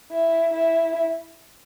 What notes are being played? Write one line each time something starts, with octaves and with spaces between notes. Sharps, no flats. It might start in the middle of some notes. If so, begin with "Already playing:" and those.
E4
E4